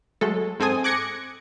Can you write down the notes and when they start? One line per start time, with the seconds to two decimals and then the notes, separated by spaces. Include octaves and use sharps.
0.21 F#3 G#3 A3 A4
0.60 G#2 C4 A4 G#5 D#6
0.84 D6 F#6 G#6 A#6 C#7